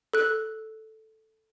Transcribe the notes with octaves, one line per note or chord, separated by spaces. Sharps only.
A4 F#6